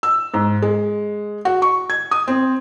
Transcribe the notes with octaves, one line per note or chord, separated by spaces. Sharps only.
E6
G#2
G#3
F#4
C#6
G#6
D#6
C4